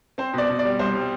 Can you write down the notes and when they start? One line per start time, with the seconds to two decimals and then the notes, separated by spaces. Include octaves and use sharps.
0.18 C4 C5
0.33 B2 D5
0.50 B2
0.59 D5
0.65 G3
0.79 C2 C5
0.95 G3